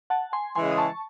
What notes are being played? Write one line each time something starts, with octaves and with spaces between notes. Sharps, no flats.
F#5 A5
G#5 C6
C#3 E3 G#3 G#5 C6
D#6
A5 C#6